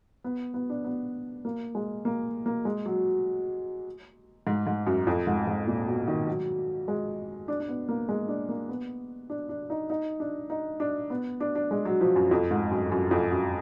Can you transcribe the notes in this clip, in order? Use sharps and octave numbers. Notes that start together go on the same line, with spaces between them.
B3
B3
D4
B3
A#3
G#3
A#3
A#3
G#3
F#3
G#2
G#2
F#2
F2
G#2
G#2
A#2
B2
D#3
F#3
G#3
D4
D4
B3
A#3
G#3
D4
A#3
B3
D4
D4
D#4
D#4
D4
D#4
D4
B3
D4
D4
G#3
F#3
F3
F#2
F2
G#2
F#2
F#2
F2
F#2